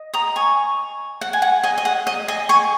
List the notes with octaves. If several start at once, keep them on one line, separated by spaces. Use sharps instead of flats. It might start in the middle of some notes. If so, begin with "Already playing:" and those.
Already playing: D#5
A#5 D#6
G#5 C#6
F#5
G#5
F#5
D#5 G#5
D#5
F#5
D#5
D#5 G#5
G#5 C#6